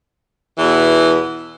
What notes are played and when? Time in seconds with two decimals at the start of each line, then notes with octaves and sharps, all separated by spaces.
0.58 E2 B2 E3